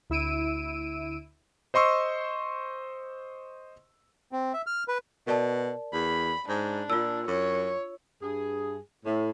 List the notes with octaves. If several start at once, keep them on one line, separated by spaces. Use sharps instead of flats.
D2 E4 E6 D7 D#7
C5 D#5 C6 C#6 E6
C4
E5
F6
B4
B2 A#4 D5 A5
E2 B5
G#2 D4
A#2 F4 E6
F#2 C#5
G2 G#4
A2